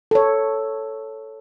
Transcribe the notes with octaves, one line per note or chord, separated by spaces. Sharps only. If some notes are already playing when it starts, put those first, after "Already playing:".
A4 C#5